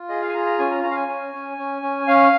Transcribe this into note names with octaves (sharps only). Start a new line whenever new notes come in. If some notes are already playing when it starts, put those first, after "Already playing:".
Already playing: F4
G#4 D#5
F5
G#5
F4 A#5
A#5
C#4 G#5
A#5
C#4 A#5
F5
G#5
C#4
C#4
C#4
C#4
C#4 F5